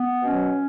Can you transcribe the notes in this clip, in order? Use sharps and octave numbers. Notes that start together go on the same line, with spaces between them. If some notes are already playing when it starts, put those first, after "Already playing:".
Already playing: B3
B2 F#3 C#4